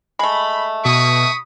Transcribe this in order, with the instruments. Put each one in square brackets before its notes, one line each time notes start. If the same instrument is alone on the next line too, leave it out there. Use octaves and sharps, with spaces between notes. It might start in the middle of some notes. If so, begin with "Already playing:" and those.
[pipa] G#3 A3 [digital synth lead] B5
[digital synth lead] B2 [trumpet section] B5 C#6 D#6